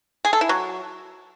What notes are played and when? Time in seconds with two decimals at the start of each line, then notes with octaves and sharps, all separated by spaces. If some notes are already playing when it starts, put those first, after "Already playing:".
0.25 G#4
0.33 A4
0.41 E4
0.49 F#3